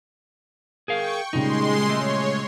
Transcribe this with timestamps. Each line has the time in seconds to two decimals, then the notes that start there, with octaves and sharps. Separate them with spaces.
0.88 G#4 A#4 F5 G5 C#6
1.33 A#2 C#3 G3 G#3 D#4 C6
1.89 A3 C#5